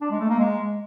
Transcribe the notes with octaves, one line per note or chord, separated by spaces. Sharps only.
D4
G#3
A3
A#3
G#3